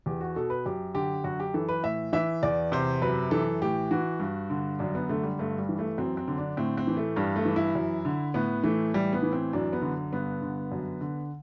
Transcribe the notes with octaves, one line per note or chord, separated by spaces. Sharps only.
E2 G4
F#4
B2 A4
B4
F#2 G4
D3 G4
F#2 F#4
G4
E3 A4
B4
A2 E5
E3 E5
E2 D5
C3 C5
F#2 B4
E3 A4
A2 G4
E3 F#4
G2
D3
F#2 D4
B3
D3 A3
G3
G2 A3
G3
E3
A3
F#2 C4
C4
D3
D4
A2 C4
C4
E3
A3
G2 G3
A3
E3
E4
F#2
D3
A2 B3
E3 A3
A2 G3
B3
E3
C4
F#2 D4
B3
D3
G2 B3
D3
F#2
D3